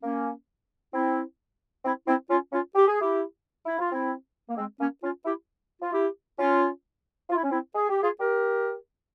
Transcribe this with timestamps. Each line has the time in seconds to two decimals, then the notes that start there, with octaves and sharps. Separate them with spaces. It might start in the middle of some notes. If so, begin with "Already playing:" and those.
0.03 A#3 C#4
0.93 C4 E4
1.85 C4 E4
2.07 C4 E4
2.30 C#4 F4
2.52 C#4 F4
2.75 G4
2.87 G#4
3.01 E4 G4
3.66 E4
3.79 F4
3.91 C4 E4
4.48 A#3
4.57 G#3 C4
4.79 A#3 C#4
5.02 C#4 F4
5.25 E4 G4
5.81 F4
5.92 E4 G4
6.38 C#4 F4
7.30 F4
7.36 E4
7.43 C#4
7.50 C4 E4
7.75 G#4
7.89 G4
8.02 F4 G#4
8.20 G4 A#4